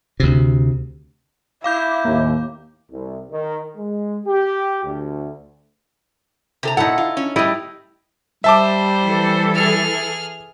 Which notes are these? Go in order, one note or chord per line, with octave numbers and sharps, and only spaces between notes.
D2 C3
E4 F5 D6 G6
D#2 A2 A#3
C2
D#3
G#3
G4
D2
C3 A4 A#5
A#2 D#4 E4 A4 F#5
F4
C#4
A2 G3 E4 D#5
G3 C5 E5 A5 D6
E3 A4
G#4 F6